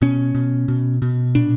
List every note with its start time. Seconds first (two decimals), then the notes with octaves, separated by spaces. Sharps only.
0.02 B2 C#4
0.35 B2
0.68 B2
1.02 B2
1.35 A#2 D4